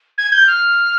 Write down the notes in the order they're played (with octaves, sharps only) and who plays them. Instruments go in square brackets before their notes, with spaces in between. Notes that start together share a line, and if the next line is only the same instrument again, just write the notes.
[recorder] G#6
G6
F6